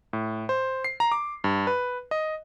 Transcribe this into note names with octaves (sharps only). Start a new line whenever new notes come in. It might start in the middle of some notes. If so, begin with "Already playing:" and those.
A2
C5
C7
A#5
D6
G2
B4
D#5